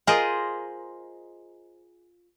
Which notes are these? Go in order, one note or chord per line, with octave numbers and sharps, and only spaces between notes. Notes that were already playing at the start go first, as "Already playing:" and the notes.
F4 G#4 A#4 C5 D#5